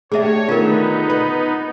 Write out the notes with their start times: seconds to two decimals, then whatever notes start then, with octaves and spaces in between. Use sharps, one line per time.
0.12 A3 D4 G4 G#4 C#5 E5
0.48 D3 D#3 B3 D#4 F4 A#4
1.10 B4